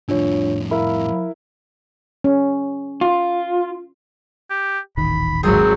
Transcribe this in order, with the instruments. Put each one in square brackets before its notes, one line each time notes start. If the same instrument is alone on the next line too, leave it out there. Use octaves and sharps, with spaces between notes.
[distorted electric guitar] F2 A2 [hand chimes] D4 F4 C#5
[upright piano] E4 A#4 [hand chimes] F5 B5
[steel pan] C#4
[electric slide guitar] F4
[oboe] G4
[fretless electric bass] D#1 A1 D#3 [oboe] B5
[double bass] G#1 F#3 [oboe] C4 [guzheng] G#4